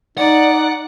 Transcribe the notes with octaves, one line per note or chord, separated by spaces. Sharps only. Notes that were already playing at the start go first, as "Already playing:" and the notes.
D#4 D5 F#5